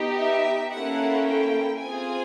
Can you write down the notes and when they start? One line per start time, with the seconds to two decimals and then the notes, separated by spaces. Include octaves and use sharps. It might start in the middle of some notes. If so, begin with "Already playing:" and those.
Already playing: B3 D#4 G4
0.19 E5
0.73 A#3 C#4 E4 A4 F#5
1.27 G5
1.81 C4 F4 G#4 G#5